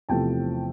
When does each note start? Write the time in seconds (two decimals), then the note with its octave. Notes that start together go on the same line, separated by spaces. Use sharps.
0.09 E2 C3 F3 A3 G5 A5